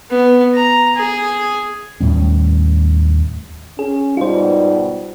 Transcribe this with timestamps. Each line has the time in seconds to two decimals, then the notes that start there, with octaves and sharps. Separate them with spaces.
0.10 B3
0.54 A#5
0.96 G#4
2.01 D#2 A2 G3 C#4
3.79 C#4 G#4
4.17 G#2 B2 G3 D#4 F4 C5